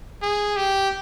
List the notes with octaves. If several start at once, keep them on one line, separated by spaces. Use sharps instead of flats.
G#4
G4